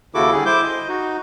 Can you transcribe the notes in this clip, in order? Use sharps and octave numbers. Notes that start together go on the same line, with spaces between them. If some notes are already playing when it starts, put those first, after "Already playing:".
D#2 C#3 E4 F#4 A4 D6
D3 G3 G#4
E4 C5 D6 G6
D#5
D#4 F#4